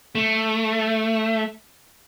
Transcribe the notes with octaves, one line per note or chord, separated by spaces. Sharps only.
A3